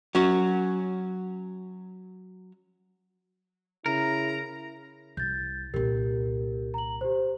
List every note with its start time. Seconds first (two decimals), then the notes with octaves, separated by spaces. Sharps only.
0.15 F#3 C#4 F#4
3.86 C#3 E4 A#4 A#5
5.17 C2 G6 A6
5.74 C2 A#2 G4 A#4
6.74 A#5 F#7
7.01 G4 C5